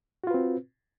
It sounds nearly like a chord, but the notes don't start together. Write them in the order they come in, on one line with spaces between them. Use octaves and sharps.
F#4 F4 B4 C4